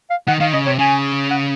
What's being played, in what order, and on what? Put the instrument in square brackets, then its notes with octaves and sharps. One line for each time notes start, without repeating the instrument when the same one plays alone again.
[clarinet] F5
[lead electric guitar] D#3 [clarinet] F#5
[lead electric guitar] D#3 [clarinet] F5
[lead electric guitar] C#3 [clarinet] D#5
[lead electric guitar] C3 [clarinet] C#5
[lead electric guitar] C#3 [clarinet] G#5
[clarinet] F#5